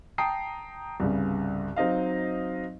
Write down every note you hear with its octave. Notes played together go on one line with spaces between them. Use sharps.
G5 A5 A#5 D#6 C7
C2 G2 C#3
F#3 C4 D#4 D#5 F5